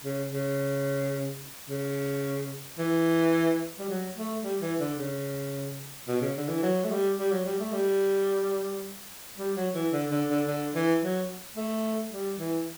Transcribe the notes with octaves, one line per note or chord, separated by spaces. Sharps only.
C#3
C#3
C#3
E3
G3
F#3
A3
G3
E3
D3
C#3
B2
C#3
D3
E3
F#3
A3
G3
G3
F#3
G3
A3
G3
G3
F#3
E3
D3
D3
D3
D3
E3
F#3
A3
G3
E3